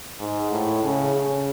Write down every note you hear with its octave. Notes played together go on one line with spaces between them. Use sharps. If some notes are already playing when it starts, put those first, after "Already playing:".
G#2
A2
C#3
C#3